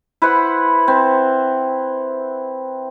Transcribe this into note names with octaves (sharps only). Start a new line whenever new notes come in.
E4 B4 C5 F#5
C4